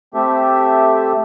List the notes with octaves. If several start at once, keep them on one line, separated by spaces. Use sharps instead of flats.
A3 C4 G4 A4 E5